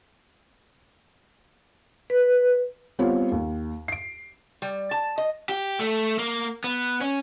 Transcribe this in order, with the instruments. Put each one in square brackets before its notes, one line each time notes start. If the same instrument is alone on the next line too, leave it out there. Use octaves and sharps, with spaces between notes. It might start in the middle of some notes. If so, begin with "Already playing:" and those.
[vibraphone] B4
[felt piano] G3 B3 C4 F4 C#5 F5
D#2
C7 D7
[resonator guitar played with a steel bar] G3
A5
D#5
[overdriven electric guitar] G4
A3
A#3
B3
C#4